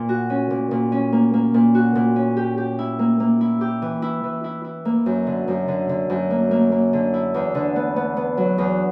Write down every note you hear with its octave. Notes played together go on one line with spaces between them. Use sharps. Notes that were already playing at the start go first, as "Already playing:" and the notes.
Already playing: A#2
F#4
C#4
A#2
A#2
C#4
A#3
A#3
A#2
F#4
A#2
C#4
G4
G4
E4
A#3
A#3
E4
G4
E3
E4
E3
E4
E4
A#3
F#2
D3
F#2
D3
D3
F#2
A#3
A#3
A#3
D3
E4
E2
D3
B3
B3
B3
F#3
E2